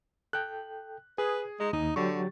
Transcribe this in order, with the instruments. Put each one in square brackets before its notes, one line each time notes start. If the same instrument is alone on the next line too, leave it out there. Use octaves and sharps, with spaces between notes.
[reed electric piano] A4 G5 [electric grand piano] F#6
[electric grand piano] G#4 [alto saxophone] B4 [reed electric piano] G#5 D#6
[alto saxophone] G#3 [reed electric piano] D#5 A#5 D#6
[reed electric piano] D#2 D#6 [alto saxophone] D#4
[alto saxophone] D3 [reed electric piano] F#3 G4 A6 [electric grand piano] C#6